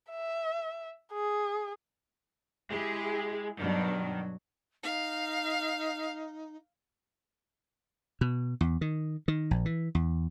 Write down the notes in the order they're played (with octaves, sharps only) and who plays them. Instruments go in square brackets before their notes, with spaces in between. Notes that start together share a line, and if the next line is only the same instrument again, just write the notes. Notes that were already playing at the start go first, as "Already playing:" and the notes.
[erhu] E5
G#4
[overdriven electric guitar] G#3 [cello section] E4 G4 G#4
[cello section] G2 B2 D4 [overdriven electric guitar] D#3 [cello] F#3
[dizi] D#4 [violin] F5
[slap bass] B2
E2
D#3
D#3
A#1
E3
E2